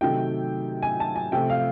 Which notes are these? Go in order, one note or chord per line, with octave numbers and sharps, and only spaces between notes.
C3 D#3 F#3 A3 G5
G#5
A5
G#5
C3 F3 A3 G5
F5